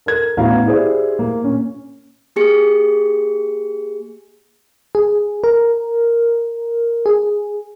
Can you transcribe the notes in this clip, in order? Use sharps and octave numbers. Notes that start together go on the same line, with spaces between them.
A4 A#4 G#6
A1 B3 E4 F#4 F5 A#5
E4 G4 G#4 C5 D5 E5
A#3
A#2 C#4
A#3 G4 G#4 C#7
G#4
A#4
G#4